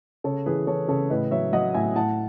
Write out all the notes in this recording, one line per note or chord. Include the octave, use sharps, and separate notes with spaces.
C#3 A4 C#5
E3 G#4 B4
E3 A4 C#5
C#3 A4 C#5
A2 B4 D#5
F#3 C#5 E5
F#3 D#5 F#5
A2 E5 G#5
A2 F#5 A5